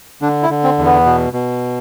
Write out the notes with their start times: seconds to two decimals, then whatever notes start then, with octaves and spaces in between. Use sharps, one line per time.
0.22 D3 D4
0.43 E4
0.50 D3
0.64 C4
0.78 E2
0.85 B3
1.06 B2
1.33 B2